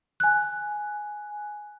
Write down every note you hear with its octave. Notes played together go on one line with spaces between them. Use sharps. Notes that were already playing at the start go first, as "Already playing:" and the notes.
G#5 F#6